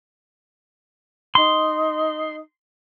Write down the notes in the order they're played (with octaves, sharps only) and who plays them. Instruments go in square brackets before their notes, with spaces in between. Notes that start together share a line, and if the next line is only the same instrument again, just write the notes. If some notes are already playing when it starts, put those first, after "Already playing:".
[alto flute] D#4 [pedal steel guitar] C6